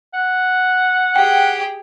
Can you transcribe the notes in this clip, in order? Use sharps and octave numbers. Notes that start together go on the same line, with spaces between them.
F#5
G4 G#4 G5